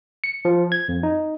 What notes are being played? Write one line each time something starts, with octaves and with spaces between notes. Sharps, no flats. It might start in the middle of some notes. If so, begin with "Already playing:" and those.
C#7
F3
G#6
F2
D#4